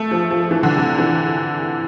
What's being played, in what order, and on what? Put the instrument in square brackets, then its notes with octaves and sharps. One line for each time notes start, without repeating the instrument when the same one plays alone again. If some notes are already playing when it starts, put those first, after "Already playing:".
Already playing: [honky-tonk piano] A3
F3
F3
E3
D3
C3
E3